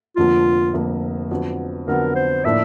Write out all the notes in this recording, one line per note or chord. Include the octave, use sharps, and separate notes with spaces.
F1 F2 D3 F3 A#3 F4
F1 F2 D3 F3 A#3
F2 D3 F#3 B3
F2 D3 F#3 B3 A#4
C5
A2 F3 A#3 D4 E5